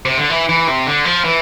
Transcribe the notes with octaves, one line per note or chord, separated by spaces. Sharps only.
C3
D3
E3
E3
C3
D3
F3
E3